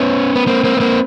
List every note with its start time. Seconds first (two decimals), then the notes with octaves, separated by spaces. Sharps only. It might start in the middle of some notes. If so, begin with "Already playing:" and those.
Already playing: B3 C#4
0.35 B3
0.47 A#3 C4
0.64 A#3 C4
0.77 B3
0.80 A#3 C4